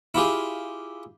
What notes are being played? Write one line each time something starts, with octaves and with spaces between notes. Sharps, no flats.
E4 F4 G4 G#4